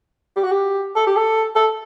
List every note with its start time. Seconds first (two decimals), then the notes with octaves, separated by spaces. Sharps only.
0.36 G4
0.44 F#4
0.52 G4
0.96 A4
1.07 G4
1.16 A4
1.56 A4